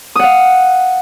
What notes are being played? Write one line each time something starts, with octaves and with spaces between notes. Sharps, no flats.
F5 F#5 D#6